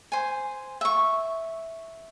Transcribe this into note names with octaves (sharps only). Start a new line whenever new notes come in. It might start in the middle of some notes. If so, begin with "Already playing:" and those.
C5 G#5
E5 C#6